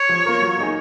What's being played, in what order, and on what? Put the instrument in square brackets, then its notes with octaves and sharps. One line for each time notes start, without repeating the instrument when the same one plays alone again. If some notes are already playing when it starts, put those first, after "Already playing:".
Already playing: [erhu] C#5
[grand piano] F3
A#3 F4 A#4
F#3
A#3 D#4 G#4